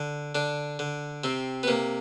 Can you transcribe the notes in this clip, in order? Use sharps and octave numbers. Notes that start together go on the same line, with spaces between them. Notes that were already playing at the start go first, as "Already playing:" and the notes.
Already playing: D3
D3 D4
D3
C3 C4
B3
C3 A#3